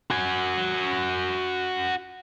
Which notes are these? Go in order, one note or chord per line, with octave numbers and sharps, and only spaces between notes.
F#4 G#5